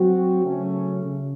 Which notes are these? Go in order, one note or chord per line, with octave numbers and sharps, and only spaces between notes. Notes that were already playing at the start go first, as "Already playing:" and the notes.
Already playing: F#3 C4 F#4
C#3 F#3 A3 C#4
C#3